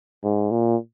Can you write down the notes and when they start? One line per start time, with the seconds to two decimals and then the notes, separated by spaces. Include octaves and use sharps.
0.24 G#2
0.51 A#2